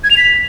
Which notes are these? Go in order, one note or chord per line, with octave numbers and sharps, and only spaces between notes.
G#6
F7
B6